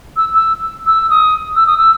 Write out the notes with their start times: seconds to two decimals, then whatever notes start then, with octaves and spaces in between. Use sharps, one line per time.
0.16 E6
0.34 E6
0.86 E6
1.10 D#6
1.56 E6
1.67 D#6
1.78 E6